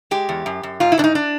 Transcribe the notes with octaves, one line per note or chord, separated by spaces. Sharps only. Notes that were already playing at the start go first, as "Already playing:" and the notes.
G#3 G4
E2
F#2
F#2
G#2 F4
E4
G#2 D4
D#4
D4